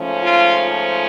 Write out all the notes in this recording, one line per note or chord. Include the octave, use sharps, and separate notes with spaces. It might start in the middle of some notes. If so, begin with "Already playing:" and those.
Already playing: G#2 F3 A3 C#4
F4